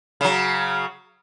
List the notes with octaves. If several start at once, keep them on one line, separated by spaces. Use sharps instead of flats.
C#3 F#3